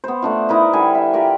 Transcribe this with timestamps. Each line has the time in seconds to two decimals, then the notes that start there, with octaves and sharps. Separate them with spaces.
0.04 B3 C5
0.22 A3 D4 F4
0.49 D#4 E4 A#4 B4
0.73 D3 G3 G#5
0.95 E5
1.13 F4 G4 A#4 D5